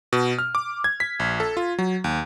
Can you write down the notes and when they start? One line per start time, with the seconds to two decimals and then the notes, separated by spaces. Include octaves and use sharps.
0.13 B2
0.39 F6
0.55 D6
0.84 G#6
1.00 B6
1.20 A#1
1.40 A4
1.57 F4
1.79 F#3
2.04 D#2